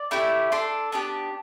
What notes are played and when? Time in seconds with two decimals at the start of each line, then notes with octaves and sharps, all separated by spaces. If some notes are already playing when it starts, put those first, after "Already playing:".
Already playing: D5
0.11 A3 E4 G4
0.52 D4 A4 C6
0.92 B3 D4 G4